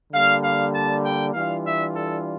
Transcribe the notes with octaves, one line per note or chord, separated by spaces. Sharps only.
D3 G3 A#3 F5
F5
A5
G5
E3 G3 D4 F4 F5
E5
A4